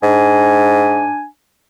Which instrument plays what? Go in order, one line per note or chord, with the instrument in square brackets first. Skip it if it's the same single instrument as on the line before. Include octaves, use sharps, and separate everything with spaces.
[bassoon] G#2 [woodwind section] D4 G#5